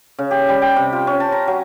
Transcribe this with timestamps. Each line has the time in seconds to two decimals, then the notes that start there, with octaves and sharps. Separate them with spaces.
0.19 C#3
0.31 G4
0.49 G3
0.62 G5
0.76 C3
0.93 F4
1.07 C#4
1.20 A5
1.32 A#5
1.47 F#3